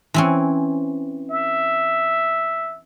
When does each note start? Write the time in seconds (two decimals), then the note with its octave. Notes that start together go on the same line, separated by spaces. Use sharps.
0.14 E3 C4 C#4
1.30 E5